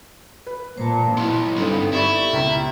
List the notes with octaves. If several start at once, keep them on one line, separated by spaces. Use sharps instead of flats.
B4
A#2 C5 A5
B1 B3 E4 C6
G2 D3 C4 D#4 A4 C6
E4 G4 D5 C#6 A6
C#2 A#5 B6